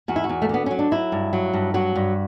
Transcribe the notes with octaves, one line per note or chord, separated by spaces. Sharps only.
E2 F#4
E4
F#4
E2
A3
D3 B3
F#3 C#4
D4
F#3 E4
G2
F#3
G2
F#3 F#4
G2